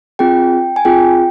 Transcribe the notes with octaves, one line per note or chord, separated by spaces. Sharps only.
C4 F4 G#4 G5
G#5
C4 F4 G#4 G5